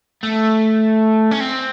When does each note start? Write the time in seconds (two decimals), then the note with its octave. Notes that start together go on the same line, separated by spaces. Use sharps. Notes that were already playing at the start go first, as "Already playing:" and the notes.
0.23 A3
1.31 C#4
1.40 C4